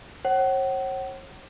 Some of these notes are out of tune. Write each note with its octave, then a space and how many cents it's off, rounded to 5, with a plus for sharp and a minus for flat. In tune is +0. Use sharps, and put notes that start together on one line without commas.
C#5 -45 F#5 +35